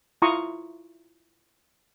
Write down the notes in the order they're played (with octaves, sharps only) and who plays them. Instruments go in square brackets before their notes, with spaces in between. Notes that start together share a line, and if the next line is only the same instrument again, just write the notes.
[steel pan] E4 F4 A#5 C6 C#6 D#6